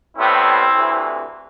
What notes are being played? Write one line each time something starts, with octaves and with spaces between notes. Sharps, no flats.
A2 G3 B3 C4 E4
D2 C3 E3